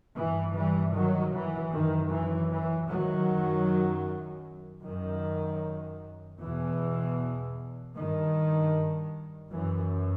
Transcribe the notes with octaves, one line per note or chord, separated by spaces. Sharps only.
G2 E3
E3 G3
D#3 F#3
E3
F#2 D#3
E3
E3
D#3 F#3
F#2
F#2 D#3
E2 B2 E3
G2 D#3
F#2 E3